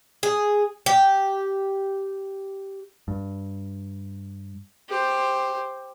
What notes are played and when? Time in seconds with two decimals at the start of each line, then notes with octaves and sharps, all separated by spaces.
0.23 G#4
0.86 G4
3.08 G2
4.89 G4 C5